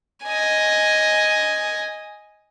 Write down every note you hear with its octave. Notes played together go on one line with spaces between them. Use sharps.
D#5 G#5